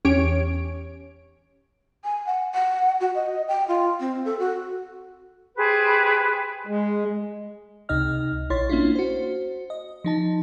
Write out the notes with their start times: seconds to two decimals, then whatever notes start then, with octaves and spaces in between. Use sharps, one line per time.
0.05 E2 C#4 G4 C#5 D7
2.04 G#5
2.26 F#5
2.54 F#5
3.01 F#4
3.15 D#5
3.48 G5
3.68 F4
4.00 C4
4.25 A4
4.39 F#4
5.56 G4 G#4 B4 C5
6.67 G#3
7.89 C#2 C3 D#4 D#5 F6
8.50 A#1 E4 C#5 C6 A6
8.69 A#3 C#4 D4 E4 F4
8.95 F#4 C5
9.70 D#5
10.04 F3 D#4 A5